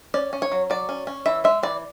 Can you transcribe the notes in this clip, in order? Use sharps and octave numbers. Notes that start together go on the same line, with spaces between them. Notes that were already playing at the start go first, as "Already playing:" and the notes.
C#4 D5
C#4
C#5
F#3
F#3 D5
C#4
C#4
E3 E5
G#3 E5
E3 D5